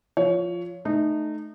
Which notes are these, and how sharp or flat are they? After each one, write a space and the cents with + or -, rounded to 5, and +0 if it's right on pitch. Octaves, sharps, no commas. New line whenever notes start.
F3 +0 C#5 +15
A3 -15 D#4 -25